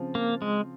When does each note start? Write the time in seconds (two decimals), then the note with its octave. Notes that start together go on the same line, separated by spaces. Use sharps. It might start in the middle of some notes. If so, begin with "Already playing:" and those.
Already playing: C#3 F3 C4 F4
0.15 A#3
0.42 G#3